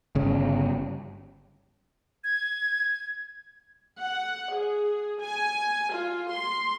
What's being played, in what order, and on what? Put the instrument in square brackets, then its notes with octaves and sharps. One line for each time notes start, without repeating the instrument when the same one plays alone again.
[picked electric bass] G1 C#3
[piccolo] G#6
[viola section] F#5
G#4
G#5
F4
C6